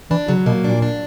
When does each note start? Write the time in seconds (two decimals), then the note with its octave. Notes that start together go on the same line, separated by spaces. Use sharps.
0.11 E3 D4
0.28 C#3 F#3
0.46 B2 A#3
0.64 A#2 D4
0.82 D4